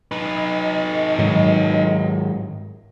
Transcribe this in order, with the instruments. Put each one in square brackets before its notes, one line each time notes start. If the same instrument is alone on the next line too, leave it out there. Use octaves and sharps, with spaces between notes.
[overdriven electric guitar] D#4 B4
[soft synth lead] D#5
[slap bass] G#2 D#3 F#3